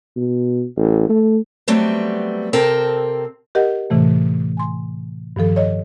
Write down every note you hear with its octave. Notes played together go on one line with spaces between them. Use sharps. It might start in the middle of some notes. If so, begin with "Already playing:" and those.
B2
A1
A3
F#3 G3 A3 B3 C4
C3 C4 A4 A#4 G5
G4 A#4 D#5 F#5
A2 C3 E3 A3
G#5 C6
G2 D#3 F3 A4
C#5 D#5